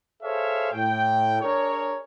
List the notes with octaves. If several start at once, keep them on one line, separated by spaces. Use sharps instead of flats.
G#4 A4 C5 C#5 E5 F5
A2 G5
D4 G#4 A#4 C#5